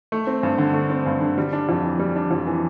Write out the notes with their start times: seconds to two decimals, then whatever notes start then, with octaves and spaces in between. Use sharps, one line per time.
0.12 A3
0.27 C4
0.43 G2
0.58 D3
0.74 A3
0.90 C4
1.06 G2
1.21 D3
1.38 G3
1.53 D4
1.69 F2
1.84 E3
2.00 G3
2.16 D4
2.31 F2
2.47 E3